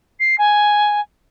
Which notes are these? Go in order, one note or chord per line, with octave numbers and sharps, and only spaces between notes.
C7
G#5